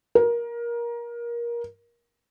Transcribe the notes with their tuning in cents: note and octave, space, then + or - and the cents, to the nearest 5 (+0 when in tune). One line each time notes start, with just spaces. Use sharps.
A#4 +20